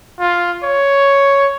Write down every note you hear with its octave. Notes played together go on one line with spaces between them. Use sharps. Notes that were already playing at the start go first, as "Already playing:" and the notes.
F4
C#5